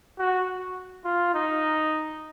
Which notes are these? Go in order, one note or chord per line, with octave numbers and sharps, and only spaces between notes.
F#4
F4
D#4